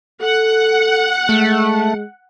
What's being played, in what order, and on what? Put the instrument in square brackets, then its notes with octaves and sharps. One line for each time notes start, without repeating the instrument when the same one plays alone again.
[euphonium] A4 [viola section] F#5
[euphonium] G#3 [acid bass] A3